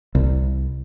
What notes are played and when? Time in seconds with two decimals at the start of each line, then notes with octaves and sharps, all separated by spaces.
0.15 C2